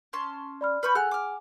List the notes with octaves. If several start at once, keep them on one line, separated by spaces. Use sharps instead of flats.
C#4 A5 C6
D5 B5 F6
B4 B5 C#6 F6 G6
G#4 A4 F#5 G#5 F6 F#6
D6 F6